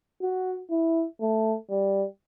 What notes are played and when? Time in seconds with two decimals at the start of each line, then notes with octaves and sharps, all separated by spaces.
0.22 F#4
0.71 E4
1.21 A3
1.70 G3